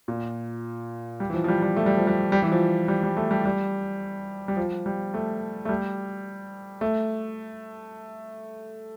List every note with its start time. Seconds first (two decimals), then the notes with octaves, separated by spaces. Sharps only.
0.08 A#2
1.20 G3
1.30 E3
1.34 F3
1.44 F3
1.48 G3
1.62 G3
1.77 A3
1.86 G3
1.97 F3
2.07 G3
2.32 G3
2.42 E3
2.52 F3
2.88 G3
3.03 G3
3.17 A3
3.31 G3
3.45 G3
4.48 G3
4.57 F3
4.86 G3
5.14 A3
5.65 A3
5.69 G3
6.81 A3